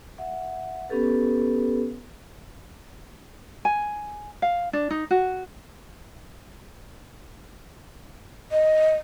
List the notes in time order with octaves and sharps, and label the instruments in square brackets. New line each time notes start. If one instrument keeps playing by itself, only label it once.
[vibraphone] E5 F#5
B3 C#4 G4 A4 B4
[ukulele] G#5
F5
D4
D#4
F#4
[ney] D#5